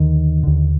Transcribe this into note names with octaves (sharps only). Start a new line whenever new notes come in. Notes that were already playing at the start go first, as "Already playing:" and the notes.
Already playing: D#2 D3 D#3
D#2 D3